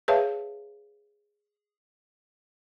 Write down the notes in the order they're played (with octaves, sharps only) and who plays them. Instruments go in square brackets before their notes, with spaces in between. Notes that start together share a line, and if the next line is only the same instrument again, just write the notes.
[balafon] G#4 B4 C#5 E5 F5 A5